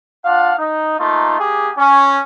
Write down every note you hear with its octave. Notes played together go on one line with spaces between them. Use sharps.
D4 F4 F5 F#5
D#4
A3 A#3 D#4 F4
A#3 G4 G#4
C#4